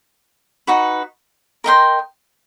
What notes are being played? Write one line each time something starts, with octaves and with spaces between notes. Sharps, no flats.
D#4 F#4 B4
A#4 D#5 G5 C6